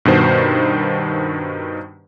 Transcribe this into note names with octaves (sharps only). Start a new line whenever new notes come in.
G2 B2 D#3 C5